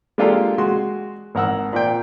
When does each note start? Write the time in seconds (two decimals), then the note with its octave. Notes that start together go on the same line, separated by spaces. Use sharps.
0.18 G#3 A#3 D4 F4 G4 A4
0.58 G#3 F#4 C6
1.35 G#1 A#4 F#5 E6
1.73 A#2 D5 G5